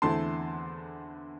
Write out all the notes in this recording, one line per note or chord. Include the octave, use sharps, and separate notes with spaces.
E2 D3 A3 C4 E4 A5 C6